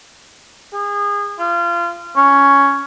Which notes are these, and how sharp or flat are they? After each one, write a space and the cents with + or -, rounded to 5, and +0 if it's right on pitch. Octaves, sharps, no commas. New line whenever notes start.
G#4 -30
F4 -25
C#4 +5